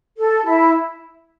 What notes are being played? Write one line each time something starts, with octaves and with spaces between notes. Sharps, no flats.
A4
E4